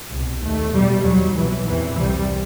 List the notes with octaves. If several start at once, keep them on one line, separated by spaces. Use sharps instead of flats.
C2 B2
D#2 A3
E2 B2 G3
D#2 F#3
C2 B2 E3
E2 C3 E3
C2 C3 G3